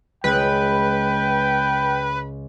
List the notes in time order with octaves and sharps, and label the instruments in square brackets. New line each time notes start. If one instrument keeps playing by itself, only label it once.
[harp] C#2 G#4 [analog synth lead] B4 [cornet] G5